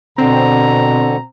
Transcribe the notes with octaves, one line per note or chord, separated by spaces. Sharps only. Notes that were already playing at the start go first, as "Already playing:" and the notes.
B2 D3 C4 A#5